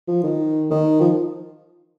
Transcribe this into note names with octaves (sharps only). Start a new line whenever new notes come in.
F3
D#3
D#3
F3